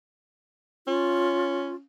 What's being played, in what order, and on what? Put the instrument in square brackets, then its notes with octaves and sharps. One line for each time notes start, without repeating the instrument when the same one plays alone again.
[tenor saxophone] C#4 [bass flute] F4